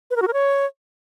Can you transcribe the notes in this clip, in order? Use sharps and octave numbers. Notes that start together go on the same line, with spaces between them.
B4
A#4
F#4
A#4
C#5